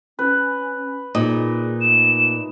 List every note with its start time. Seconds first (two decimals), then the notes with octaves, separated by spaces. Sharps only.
0.19 C#4 B4
1.15 A#2 D#4 G#4 D#5
1.81 A3 E7